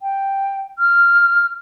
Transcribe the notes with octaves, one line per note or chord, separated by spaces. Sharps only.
G5
F6